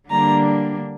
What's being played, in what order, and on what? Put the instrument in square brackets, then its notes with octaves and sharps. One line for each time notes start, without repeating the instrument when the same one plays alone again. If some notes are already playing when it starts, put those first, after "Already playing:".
[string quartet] D3 G3 A#3 D4 A#5